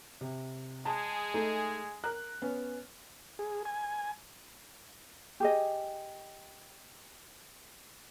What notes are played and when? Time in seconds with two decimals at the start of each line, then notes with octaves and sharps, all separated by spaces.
0.21 C3
0.85 G#3 G#4 A5
1.34 A3 D#4 A4
2.04 A#4 F#6
2.42 B3 C#4
3.39 G#4
3.65 G#5
5.40 G4 G#4 D#5